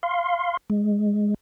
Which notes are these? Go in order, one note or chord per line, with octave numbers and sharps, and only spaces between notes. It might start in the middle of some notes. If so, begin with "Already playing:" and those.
F5 C6
G#3